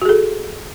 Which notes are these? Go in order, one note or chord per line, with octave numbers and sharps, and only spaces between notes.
F#4 G#4 A4